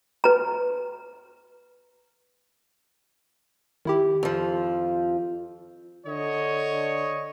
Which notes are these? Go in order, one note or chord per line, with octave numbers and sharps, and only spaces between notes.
B4 A#5
D#3 E4 G4
F2 F3
D3 C#5 D#5